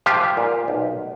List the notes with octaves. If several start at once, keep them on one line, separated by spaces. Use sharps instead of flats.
F3 F4 G4
A#2
B1